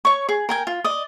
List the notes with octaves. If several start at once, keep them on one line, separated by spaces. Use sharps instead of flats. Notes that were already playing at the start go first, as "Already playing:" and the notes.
C#5 C#6
G#4
A#4 G5 G#5
F4
D5 D#5